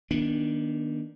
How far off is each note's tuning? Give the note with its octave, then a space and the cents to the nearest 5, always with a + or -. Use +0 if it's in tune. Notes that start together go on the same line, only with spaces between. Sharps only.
D#3 +0 B3 -40 D4 +0